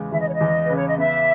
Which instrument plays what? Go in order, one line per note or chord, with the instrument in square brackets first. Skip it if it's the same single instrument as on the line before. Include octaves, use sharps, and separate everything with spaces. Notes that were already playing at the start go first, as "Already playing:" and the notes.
Already playing: [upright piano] E2 C#3 G#3
[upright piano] E2 [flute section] E5
[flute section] D#5
C#5
D#5
[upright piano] E2
[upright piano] C#3 [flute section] B4
[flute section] C#5
D#5
[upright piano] B3 [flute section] E5